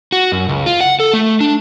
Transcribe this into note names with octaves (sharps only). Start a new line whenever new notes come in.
F#4
F#2
C#2
F4
F#5
A4
A3
D4